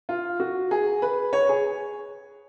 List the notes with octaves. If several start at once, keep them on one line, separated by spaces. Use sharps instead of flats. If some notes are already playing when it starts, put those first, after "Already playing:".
F4
F#4
G#4
B4
C#5
G#4